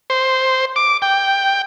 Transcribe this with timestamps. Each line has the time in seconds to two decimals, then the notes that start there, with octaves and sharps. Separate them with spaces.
0.10 C5
0.76 D6
1.02 G5